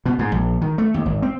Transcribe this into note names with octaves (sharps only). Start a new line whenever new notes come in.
B2
G#2
A#1
D#3
A3
D#2
G#1
C4